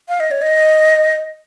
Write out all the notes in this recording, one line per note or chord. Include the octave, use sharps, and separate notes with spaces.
F5
D#5
C#5
D#5